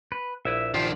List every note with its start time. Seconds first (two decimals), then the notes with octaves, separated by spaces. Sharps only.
0.12 B4
0.45 A#1 E4 B4 E5
0.74 D#3 D4 F4 G4 C5